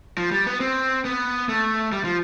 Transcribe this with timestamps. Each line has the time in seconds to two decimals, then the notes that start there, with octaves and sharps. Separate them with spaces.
0.18 F3
0.31 G3
0.46 B3
0.60 C4
1.05 B3
1.49 A3
1.92 G3
2.04 F3